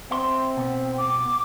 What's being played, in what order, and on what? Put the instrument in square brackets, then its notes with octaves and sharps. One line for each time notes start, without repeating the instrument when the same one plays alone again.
[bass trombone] C4 [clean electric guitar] E5 C6
[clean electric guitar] B2 B3
[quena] D6